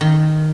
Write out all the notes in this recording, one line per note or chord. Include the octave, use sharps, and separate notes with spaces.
D#3